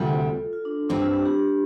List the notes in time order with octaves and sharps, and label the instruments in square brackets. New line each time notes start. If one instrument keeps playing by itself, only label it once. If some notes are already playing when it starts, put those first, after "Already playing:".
Already playing: [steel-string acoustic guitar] D2 C3 G3 D4 [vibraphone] F4 A4
[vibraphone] F4
D4
[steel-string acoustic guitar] G2 G3 C4 [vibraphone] D4
[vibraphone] F4
D4 G4
D4 G4